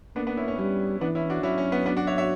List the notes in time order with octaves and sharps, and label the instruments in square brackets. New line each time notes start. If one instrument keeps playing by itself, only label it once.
[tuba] A#3 [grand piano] B3 D4
[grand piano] B3 D4
C#4 E4
C#4
[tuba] G3 [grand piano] C#4
[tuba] E3 [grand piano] B3 D4
[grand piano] C#4 E4
D4 F#4
[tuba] F#3 [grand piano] C#4 E4
[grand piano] C#4
B3
B3 D4
D4 F#4
C#5 E5
C#5 E5